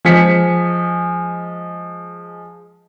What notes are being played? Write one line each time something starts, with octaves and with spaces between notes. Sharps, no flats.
F3 G#3 G#5 B6 C#7